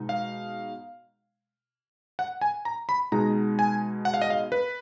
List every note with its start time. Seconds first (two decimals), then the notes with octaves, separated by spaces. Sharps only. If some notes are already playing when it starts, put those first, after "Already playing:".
Already playing: B2 G#3 D#4
0.09 F5
2.19 F#5
2.41 G#5
2.65 A#5
2.89 B5
3.12 B2 G#3 D#4 A#5
3.59 G#5
4.05 F#5
4.14 F5
4.22 D#5
4.30 F5
4.52 B4